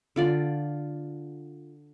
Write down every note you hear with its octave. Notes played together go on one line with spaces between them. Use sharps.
D3 F4 D5